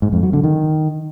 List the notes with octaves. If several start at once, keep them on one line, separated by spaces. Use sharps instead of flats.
G#2
F2
F#3
D3
D#3